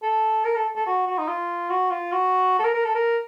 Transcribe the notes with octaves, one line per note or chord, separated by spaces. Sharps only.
A4
A#4
A4
A4
F#4
F#4
D#4
F4
F#4
F4
F#4
A4
A#4
A#4
A4
A#4